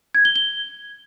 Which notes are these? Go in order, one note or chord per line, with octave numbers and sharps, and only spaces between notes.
G#6
G7
G7